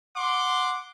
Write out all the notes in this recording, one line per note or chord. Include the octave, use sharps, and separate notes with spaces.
F#5 C6 D6